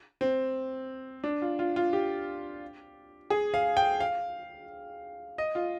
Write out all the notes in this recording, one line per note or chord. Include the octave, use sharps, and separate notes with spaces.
C4
D4
F4
F4
F4
G4
G#4
F5
G5
F5
D#5
F4